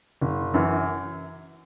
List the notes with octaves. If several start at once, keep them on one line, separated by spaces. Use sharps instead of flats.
F#1
F#2 E3